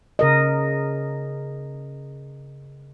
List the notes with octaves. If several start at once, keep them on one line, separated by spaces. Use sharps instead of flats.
C#3 A#4 D#5